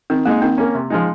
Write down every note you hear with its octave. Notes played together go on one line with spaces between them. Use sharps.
D#3 C4
G#3 A#3 D#4
D#3 C4
A#3 C#4
C3
F3 G#3 D#4